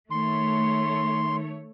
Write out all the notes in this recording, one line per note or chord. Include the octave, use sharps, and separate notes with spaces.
D#3 A3 C#5 C6